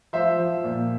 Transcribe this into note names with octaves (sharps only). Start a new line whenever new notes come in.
F3 C5 E5
F3
A#2